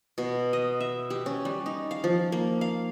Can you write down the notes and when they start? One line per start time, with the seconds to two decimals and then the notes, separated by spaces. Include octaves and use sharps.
0.18 B2
0.53 D#5
0.80 E5
1.10 G4
1.26 C#4
1.45 G3
1.66 D#4
1.91 F5
2.04 F3
2.32 A#3
2.61 F5